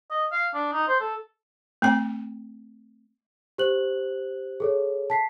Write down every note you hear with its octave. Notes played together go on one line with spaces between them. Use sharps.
D#5
F5
D4
D#4
C5
A4
A3 C4 G5
G4 C5 F#6 F#7
G#4 A4 C#5
A5 B6 C7